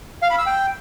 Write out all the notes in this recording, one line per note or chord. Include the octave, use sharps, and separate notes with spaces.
F5
B5
E6
G5